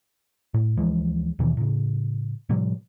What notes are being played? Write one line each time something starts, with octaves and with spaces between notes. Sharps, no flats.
A2
D2 E3 F3 G#3
D#2 B2 D#3 E3
A2 C#3
A2 C3 F3 G3